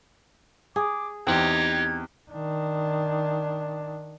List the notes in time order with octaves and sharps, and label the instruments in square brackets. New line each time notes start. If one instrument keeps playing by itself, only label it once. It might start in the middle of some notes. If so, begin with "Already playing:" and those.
[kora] G#4 [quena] D6
[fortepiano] E2 [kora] C4 [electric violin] D#4 G4 [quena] G#6
[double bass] D#3 D4